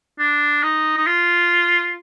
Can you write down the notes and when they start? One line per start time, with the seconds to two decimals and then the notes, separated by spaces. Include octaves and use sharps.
0.19 D4
0.63 D#4
0.97 D#4
1.06 F4